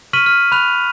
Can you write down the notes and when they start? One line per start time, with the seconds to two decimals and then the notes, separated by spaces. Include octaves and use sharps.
0.13 C#6 F6 B6 D#7 F#7
0.26 F6
0.52 B5 F#6 F7